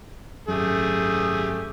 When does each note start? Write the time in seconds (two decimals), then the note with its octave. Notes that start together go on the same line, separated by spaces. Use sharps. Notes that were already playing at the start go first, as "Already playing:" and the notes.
0.48 G#1 F#2 A3 G4 G#4